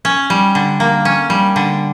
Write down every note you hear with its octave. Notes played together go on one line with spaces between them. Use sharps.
C#4
G3
D3
A#3
C#4
G3
D3